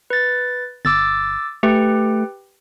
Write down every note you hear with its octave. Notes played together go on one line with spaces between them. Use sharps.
B4 A6
G1 D6 E6 A6
A3 G4 B4 G5